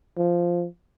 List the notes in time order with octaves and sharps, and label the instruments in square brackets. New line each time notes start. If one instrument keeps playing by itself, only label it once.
[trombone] F3